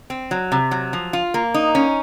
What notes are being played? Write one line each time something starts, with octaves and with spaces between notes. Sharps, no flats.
C4
F#3
C3
F#3
F3
F4
A#3
D#4
C#4